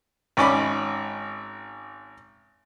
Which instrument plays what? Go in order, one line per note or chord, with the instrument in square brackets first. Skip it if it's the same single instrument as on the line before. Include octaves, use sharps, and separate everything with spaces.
[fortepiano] G#1 C#4 D5 B5